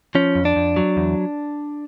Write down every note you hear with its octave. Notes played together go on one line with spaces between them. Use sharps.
F3 C#4
F2
D4
F2
F#3
E2